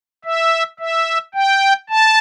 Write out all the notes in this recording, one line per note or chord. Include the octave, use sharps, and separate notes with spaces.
E5
E5
G5
A5